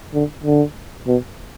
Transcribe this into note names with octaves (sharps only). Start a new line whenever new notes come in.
D3
D3
B2